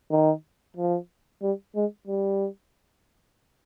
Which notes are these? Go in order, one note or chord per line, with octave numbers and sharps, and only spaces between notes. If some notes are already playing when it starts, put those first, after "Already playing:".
D#3
F3
G3
G#3
G3